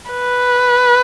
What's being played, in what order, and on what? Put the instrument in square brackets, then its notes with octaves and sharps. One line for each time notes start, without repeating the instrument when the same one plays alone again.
[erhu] B4